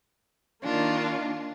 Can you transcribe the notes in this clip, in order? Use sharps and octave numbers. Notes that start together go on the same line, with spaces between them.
D#3 A#3 D4 F4